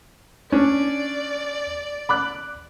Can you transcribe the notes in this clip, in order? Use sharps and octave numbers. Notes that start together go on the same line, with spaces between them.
C#4 D4 D5
B5 D6 F#6